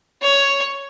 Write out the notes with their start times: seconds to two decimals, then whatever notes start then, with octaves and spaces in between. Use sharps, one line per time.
0.23 C#5